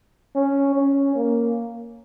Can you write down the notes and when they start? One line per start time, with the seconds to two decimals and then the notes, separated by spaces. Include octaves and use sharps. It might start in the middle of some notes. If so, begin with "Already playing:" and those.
0.35 C#4
0.76 C#4
1.15 A#3